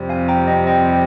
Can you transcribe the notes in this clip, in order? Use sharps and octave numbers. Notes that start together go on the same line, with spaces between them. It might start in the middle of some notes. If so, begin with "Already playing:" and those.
Already playing: F2 C3 G3
F5 G#5
G5 A#5
D#5 G5
D#5 G5